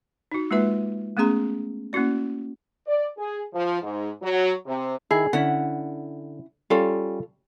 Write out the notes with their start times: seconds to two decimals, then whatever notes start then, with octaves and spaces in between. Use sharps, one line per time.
0.32 D#4 F#4
0.51 G#3 A#3 F4 B4 E5
1.17 A3 B3 C#4 G#4 A#5 C6
1.93 A#3 C#4 E4 F#4 D5
2.86 D5
3.17 G#4
3.53 F3
3.82 G#2
4.22 F#3
4.66 C3
5.11 D#3 E4 G#4
5.33 D3 C#4 E4 F#5
6.70 G3 C#4 F4 A4 F5